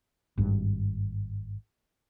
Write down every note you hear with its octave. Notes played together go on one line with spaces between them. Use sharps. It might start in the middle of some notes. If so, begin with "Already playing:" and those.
G#1 G2